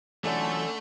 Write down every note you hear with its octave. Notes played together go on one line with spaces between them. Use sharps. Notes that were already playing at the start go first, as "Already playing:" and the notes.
D3 E3 F#3 A3 C#4 A4